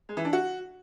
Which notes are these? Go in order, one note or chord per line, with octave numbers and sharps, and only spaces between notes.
G#3
E3
D4
F#4